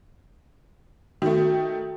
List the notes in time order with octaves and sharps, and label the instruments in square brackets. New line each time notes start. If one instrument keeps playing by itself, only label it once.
[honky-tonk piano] D#3 A3 [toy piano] F#4